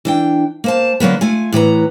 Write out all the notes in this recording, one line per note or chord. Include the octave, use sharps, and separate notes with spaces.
E3 D4 G5
A#3 C5 A5
D3 F#3 A#3 B3
A3 F4 G#5
A2 E3 B4 A#5